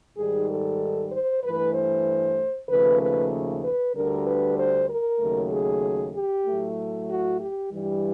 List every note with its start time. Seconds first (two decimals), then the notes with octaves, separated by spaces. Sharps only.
0.17 G#2 D#3 G3 G#4
0.49 A4
1.12 C5
1.43 G2 E3 A3 B4
1.75 C5
2.69 D#2 C#3 F3 A3 B4
3.01 B4
3.64 B4
3.94 D2 D3 G3 A#4
4.26 B4
4.58 C5
4.89 A#4
5.20 D#2 C#3 F#3 A3
5.52 G#4
6.14 G4
6.46 A2 F#3 A3
7.10 F#4
7.40 G4
7.72 G2 E3 G3